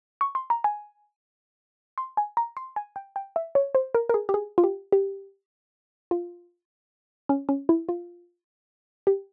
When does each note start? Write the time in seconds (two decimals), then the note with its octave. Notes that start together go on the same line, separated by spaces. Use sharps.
0.21 C#6
0.35 C6
0.50 A#5
0.64 G#5
1.98 C6
2.17 G#5
2.37 A#5
2.57 C6
2.76 G#5
2.96 G5
3.16 G5
3.36 E5
3.55 C#5
3.75 C5
3.95 A#4
4.09 A#4
4.14 G#4
4.29 G4
4.34 G#4
4.58 F4
4.64 G4
4.92 G4
6.11 F4
7.29 C#4
7.49 C#4
7.69 E4
7.89 F4
9.07 G4